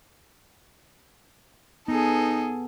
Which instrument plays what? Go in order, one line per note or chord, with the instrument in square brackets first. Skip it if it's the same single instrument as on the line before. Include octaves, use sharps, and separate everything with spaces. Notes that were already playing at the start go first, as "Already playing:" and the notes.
[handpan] B3 [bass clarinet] D#4 [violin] G#4 A4